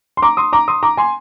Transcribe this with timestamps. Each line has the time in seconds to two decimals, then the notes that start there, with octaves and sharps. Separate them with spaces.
0.17 C6
0.22 A#5 D6
0.37 C6 D#6
0.53 A#5 D6
0.68 C6 D#6
0.83 A#5 D6
0.97 G#5 C6